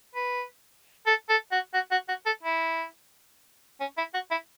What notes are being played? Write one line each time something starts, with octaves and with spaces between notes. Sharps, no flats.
B4
A4
A4
F#4
F#4
F#4
F#4
A4
E4
C#4
E4
F#4
E4